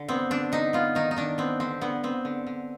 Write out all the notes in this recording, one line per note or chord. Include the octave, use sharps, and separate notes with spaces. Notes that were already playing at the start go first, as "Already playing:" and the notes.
Already playing: D3
B3 C4
D3 D4
D3 D#4
B3 F4
D#3 D#4
D#4
D#3 D4
B3 C4
D3 C4
D3 B3
B3 C4
D3
D3